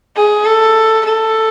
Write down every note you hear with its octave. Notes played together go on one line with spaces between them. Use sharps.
G#4
A4
A4